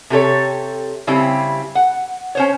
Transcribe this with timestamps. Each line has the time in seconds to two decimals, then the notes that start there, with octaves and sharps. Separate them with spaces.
0.10 C3 G4 A4 C#5
1.07 C#3 G3 C4 E4 G4
1.75 F#5
2.35 C#4 C5 C#5